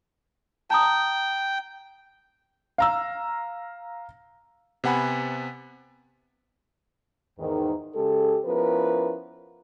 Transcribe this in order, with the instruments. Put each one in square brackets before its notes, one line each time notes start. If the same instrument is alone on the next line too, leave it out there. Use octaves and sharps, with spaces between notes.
[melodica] G5 [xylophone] A5 A#5 D#6
[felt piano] F5 A#5 E6
[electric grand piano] C3 B3 F#5 G#5 B5
[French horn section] E2 G#2 D#3
C#3 G#3 G4 A4
F3 B3 C#4 E4 A#4 B4